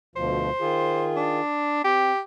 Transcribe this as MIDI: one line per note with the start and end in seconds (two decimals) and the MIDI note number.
0.16 0.50 38
0.16 0.50 47
0.16 0.50 53
0.16 1.08 72
0.61 1.40 51
0.61 1.40 65
0.61 1.40 68
1.16 1.80 62
1.84 2.12 60
1.84 2.20 67